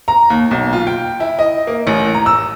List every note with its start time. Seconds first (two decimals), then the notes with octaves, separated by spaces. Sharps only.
0.08 A#5
0.30 D#2
0.51 B1
0.73 F4
0.87 G5
1.20 E4
1.39 D#5
1.67 A#3
1.87 A1
2.14 A#5
2.26 E6